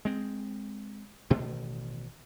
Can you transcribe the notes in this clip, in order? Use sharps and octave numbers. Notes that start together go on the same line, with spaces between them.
G#3 C4
A1 B2 D#3 A3